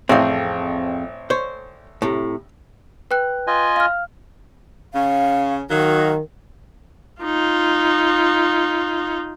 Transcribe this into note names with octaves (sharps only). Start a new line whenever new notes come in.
A1 F2 C4 G#4 F5
C5 C#5
A2 C3
B4 G5 F#6
F4 D#5 G#5
F5 F6
C#3 C#4 F5
D#3 F#3 D#4 F#4 F5
D#4 F4